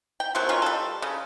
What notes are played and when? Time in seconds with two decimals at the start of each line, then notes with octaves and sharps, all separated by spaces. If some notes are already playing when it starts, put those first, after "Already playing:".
0.20 G5
0.35 F#3 A3 A#3 C4
0.49 D#3 C#4 F4 C#5
0.62 G3 A4
1.02 C#3